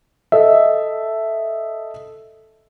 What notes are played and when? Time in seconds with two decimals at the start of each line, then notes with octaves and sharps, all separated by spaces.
0.32 A4 D#5 E5